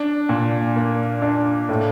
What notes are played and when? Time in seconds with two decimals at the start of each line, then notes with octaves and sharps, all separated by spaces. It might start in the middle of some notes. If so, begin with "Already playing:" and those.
Already playing: D4
0.29 A#2
0.76 A#3
1.22 D4
1.69 A2